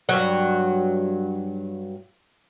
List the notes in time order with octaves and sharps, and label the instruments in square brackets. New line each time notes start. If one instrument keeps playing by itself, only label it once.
[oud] G2 F#3